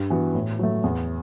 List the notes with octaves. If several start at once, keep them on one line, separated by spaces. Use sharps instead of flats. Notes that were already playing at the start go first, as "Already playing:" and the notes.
Already playing: G2
E3 B3 F#4
A2
F#3 A3
E2